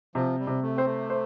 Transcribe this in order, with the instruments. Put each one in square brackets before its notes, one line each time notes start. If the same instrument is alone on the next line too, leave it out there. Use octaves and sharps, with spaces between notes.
[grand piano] C3 [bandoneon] F3
[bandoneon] G3
[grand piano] C3
[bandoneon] A3
[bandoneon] C4 [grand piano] C5
[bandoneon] A3
[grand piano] C5